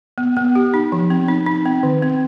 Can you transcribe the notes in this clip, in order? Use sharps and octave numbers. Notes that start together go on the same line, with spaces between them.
B3
B3
G4
D#4
F3
C4
D#4
D#4
C4
D#3
C4